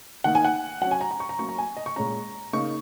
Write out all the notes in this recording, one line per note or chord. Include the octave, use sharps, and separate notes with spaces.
D#3 A#3 D#4 F#5
G#5
F#5
F#3 C#4 F#5
G#5
A#5
A#5
C#6
A#5
F#3 A#3 C#4 C#6
A#5
G#5
D#5
C#6
A#2 G#3 C#4 A#5
C#3 A#3 D#4 C#6